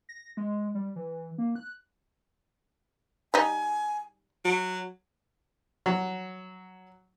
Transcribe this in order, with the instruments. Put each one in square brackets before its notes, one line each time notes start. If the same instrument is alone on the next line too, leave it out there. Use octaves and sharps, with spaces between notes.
[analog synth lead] A#6
G#3
G3
E3
A#3
F#6
[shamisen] G3 D#4 [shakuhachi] G#5
[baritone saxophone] F#3
[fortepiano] F#3